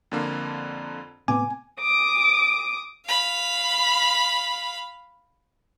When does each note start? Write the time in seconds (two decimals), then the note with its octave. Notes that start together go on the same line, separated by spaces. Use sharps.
0.12 F2 D3 A#3
1.28 A2 C3 B3 G#5 D6
1.80 D6 D#6
3.06 F5 B5